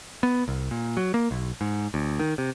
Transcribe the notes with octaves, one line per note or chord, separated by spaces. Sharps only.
B3
C2
A#2
F#3
A#3
B1
G#2
D2
D#3
C3